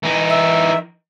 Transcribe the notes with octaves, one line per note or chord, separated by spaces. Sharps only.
E3 D#4
E5